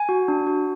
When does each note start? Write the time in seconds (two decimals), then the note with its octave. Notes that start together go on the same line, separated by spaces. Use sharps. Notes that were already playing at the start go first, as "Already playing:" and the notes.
Already playing: G#5
0.09 F#4
0.28 D4
0.47 F#4